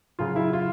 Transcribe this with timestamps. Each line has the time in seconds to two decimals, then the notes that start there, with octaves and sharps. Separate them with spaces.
0.19 C#3 F#3 F4
0.36 E4
0.53 F4